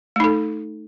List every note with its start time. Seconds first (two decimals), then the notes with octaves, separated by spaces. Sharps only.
0.16 A3
0.20 D#4
0.24 A4